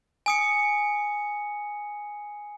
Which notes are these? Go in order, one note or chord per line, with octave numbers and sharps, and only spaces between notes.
G#5 D#6 C#7